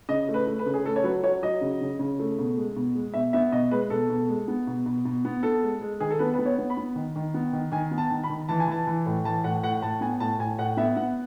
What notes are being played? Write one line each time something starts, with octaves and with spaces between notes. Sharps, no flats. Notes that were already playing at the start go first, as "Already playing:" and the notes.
C#3 D#5
A3
B4
A3
B4
C#3
G#4
A3 A4
C#5
F#3 B4
F#3 C#5
F#3 D#5
C#3
C#3
C#3
A3
B2
G#3
B2
G#3
B2 E5
B3 E5
B2 D#5
G#3 B4
B2 A4
B2
G#3
B3
B2
B2
B2
B3
B3 A4
G#3
G#3
D#3 G#4
A4
B3 B4
B4
B3
C#5
B3
B5
B3
D#3
D#3
B3
D#3
D#3 G#5
B3
A5
D#3
B5
D#3
E3 A5
G#5
E3 A5
E3
A2
E3 A5
A2 F#5
A2 F#5
A2 A5
B3 G#5
A2 A5
A2 G#5
A2 F#5
B3 E5
B3 F#5